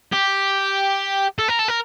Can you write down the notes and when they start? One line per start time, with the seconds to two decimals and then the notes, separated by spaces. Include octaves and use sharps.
0.12 G4
1.39 A4
1.48 A#4
1.59 A4
1.68 A#4